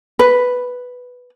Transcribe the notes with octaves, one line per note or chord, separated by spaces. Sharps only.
B4